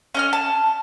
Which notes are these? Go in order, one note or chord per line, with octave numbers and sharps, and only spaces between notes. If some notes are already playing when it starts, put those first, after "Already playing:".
C#4 D#5 F6
A5